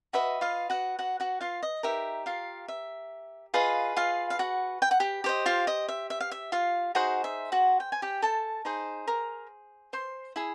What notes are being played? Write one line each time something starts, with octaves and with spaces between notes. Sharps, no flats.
F#4 B4 D#5 E5
F4 F5
F#4 F#5
F#4 F#5
F#4 F#5
F4 F5
D#5
D#4 G4 A#4 E5
F4 F5
E5
F4 G#4 B4 D#5 F5
F4 F5
F5
F#4 F#5
G5
F#5
G4 G5
G4 C5 D#5
F4 F5
D#5
E5
E5
F5
E5
F4 F5
D#4 F#4 G#4 C5 F#5
E5
F#4 F#5
G5
G#5
G4 G5
A4 A5
D#4 G#4 C5
A#4 A#5
C5 C6
E4 G#4